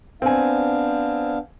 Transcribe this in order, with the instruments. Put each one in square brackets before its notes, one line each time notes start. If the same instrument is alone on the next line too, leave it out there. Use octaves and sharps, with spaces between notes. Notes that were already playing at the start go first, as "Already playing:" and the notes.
[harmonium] B3 D4 F5 [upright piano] C4 G#5